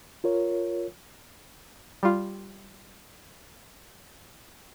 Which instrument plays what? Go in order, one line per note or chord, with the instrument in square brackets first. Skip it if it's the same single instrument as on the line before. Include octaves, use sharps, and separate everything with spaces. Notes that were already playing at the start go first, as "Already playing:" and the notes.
[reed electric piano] F4 A#4 C#5
[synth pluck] G3 F4